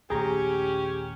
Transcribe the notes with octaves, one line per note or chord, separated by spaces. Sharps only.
A#1 D#2 A3 C#4 G4 G#4 G#5 A#5